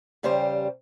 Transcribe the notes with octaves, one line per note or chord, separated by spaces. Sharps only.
E2 C#3 G3 G4 C5